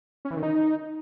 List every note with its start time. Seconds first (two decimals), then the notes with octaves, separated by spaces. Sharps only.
0.25 C#4
0.31 E3
0.37 D#3
0.43 D#4